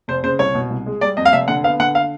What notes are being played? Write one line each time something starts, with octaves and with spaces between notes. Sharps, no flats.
F1 C5
C#3 C5
C2 C#5
B2
C2
G#3
G3 D5
F2 D#5
F5
F1 E5
D3 F#5
B3 F5
D3 F#5
F5